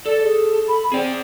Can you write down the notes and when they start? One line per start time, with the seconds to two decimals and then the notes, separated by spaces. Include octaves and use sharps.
0.06 A4 D5
0.23 G#4
0.68 B5
0.92 C4 G#4 D5